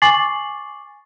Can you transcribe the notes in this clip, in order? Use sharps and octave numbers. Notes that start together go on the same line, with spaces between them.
G#5 C#6 D6 A6 C7 F#7